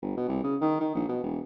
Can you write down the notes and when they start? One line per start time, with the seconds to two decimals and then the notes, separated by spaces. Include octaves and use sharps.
0.02 G1
0.17 B2
0.28 C2
0.44 C#3
0.61 D#3
0.80 D#3
0.95 A#1
1.08 B2
1.23 E1